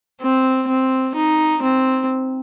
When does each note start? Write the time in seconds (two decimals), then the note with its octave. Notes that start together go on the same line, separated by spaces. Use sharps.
0.21 C4
0.68 C4
1.16 D#4
1.63 C4